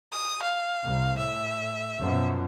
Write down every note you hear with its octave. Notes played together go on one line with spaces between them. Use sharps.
D#6
F5
C2
A2 E5
F#2 B2 F3